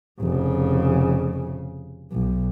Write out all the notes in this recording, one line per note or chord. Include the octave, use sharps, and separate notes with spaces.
F1 C#3
B1